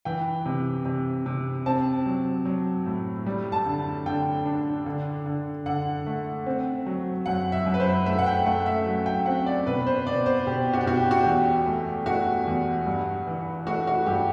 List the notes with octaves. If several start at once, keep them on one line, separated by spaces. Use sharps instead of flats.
E3 G5
C3
C3
C3
C4 A5
F#3
F#3
A2
G3
A5
D3
D3 G5
D4
D3
D3
D3 F#5
A3
C4
F#3
F#2 F#5
E5
F#2
B4
C5
A3 E5
F#5
G5
A3 F#5
E5
F#3
G5
C4 F#5
D5
B2 B4
C5
B2 D5
C5
B2 G4
F#4
G4
B2 F#4
G4
F#4
E2 G4
A3
A3 F#4
E2
G2
E3
A3 F#4
F#4
G2 G4